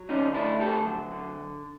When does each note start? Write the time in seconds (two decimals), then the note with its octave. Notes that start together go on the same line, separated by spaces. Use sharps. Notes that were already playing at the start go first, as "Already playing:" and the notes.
Already playing: F#3
0.09 D3 C#4 D#4
0.34 A3 D4 E4
0.60 D3 G4 A4
0.86 F#3
1.12 D3